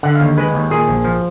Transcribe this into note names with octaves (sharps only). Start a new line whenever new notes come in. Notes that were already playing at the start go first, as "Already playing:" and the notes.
D3 F#5
F5
D#2
G#3 B4
D#2
A#2 G#4
A#1
F3